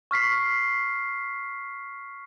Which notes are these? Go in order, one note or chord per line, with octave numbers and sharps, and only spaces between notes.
C#6 F6 B6 C7